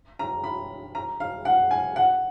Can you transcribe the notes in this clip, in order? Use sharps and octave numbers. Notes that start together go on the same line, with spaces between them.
A#5
B5
A#5
F5
F#5
G#5
F#5